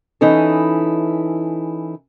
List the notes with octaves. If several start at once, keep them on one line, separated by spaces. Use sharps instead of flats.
E3 C#4 D#4 E4 A4